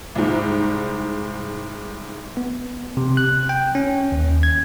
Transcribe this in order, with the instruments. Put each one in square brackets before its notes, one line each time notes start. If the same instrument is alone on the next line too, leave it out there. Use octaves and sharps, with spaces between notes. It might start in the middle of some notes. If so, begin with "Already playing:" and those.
[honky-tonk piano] C2 G#2
[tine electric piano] B3
C3
F#6
G5
C#4
D#2
G#6